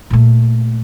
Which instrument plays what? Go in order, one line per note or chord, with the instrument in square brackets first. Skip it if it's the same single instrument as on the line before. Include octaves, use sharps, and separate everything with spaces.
[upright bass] A#2 A3